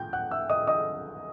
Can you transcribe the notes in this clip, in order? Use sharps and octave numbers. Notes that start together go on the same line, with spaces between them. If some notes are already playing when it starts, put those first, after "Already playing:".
Already playing: G5 G6
F#5 F#6
E5 E6
D#5 D#6
D#5 D#6